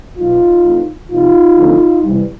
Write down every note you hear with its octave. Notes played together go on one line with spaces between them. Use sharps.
B2 F#3 B3 D#4 F4
E3 A3 C4
C3 F3 A#3 D#4 F4
D3 F3 A3 C4
C3 E3 G3